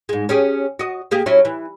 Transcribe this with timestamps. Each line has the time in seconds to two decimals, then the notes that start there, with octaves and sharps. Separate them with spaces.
0.09 G#2 G#3
0.29 C#4 G4 G#4
0.79 F#4 D#5
1.11 A#3 G4 G#4
1.26 F#3 C#4 E4
1.45 E3